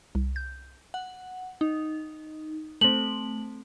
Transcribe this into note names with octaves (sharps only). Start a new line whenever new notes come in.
C2
G6
F#5
D#4
A3 C4 F#7